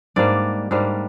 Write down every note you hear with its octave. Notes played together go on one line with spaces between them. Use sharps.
G#2 G3 A#3 D4 D5
G#2 G3 A#3 D4